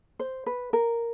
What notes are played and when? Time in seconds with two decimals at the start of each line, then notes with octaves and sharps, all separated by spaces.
0.19 C5
0.46 B4
0.73 A#4